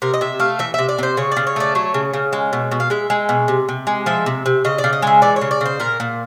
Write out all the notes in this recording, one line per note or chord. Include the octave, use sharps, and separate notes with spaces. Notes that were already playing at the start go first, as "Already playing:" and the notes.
C3 A#4
D#5
C3 E5
A3 F5
E3 E5
C3 E5
D5
C3 C5
C#3 C#5
C#3 D5
C#5
A3 D5
F#3 C#5
C#3
C#3
G#3
B2
B2
F5
G#3 E5
G#3
B2
C3
C3
G#3
F3 E5
C3
C3
C#3 D#5
D5
C#3
D#5
G#3 E5
E3 D5
C#5
C#3
D5
C#3 C5
A#2 A#4
A#2